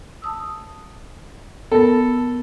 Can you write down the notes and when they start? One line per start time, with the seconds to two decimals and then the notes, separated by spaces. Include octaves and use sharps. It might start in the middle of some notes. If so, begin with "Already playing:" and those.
0.22 A5 D#6 E6
1.72 B3 A4 A#4